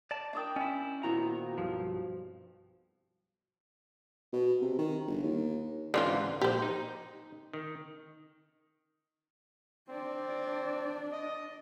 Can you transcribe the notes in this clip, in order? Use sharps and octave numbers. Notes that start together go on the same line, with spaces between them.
D5 A5
D4 A#4 D#5 G5 D6 D#6
C#4 E4 D#5
A#2 D#3 B3 C4 E4 F#4 A#5
B1 G2 F3
B2
C3
D#3
G1
D#2
C#2 G#2 D3 E3 C4 F4
A#1 G4 C5 D5
D#4
D#3
C4 D4 D5
D#5